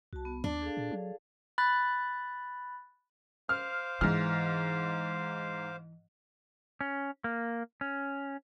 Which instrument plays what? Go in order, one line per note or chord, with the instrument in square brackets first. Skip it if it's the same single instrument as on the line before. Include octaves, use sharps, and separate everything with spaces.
[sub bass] C2 [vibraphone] F#4 A5
[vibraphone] B3
[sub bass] D#2 [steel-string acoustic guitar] D4 [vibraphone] D6
[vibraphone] G#4 A4 F5
[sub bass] A#2
F#3
[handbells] B5 F#6 A6
[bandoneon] C5 F5 D6 [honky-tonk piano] F6
[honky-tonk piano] G#2 F6 [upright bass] E3
[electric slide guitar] C#4
A#3
C#4